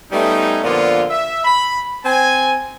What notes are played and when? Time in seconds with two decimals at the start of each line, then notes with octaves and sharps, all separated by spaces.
0.12 G3 A3 B3 C#4 D#4
0.64 A#2 D3 F3 A#3 B3 F4
1.10 E5
1.45 B5
2.05 C4 G#5